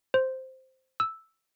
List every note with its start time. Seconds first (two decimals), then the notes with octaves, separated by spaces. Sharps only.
0.14 C5
1.00 E6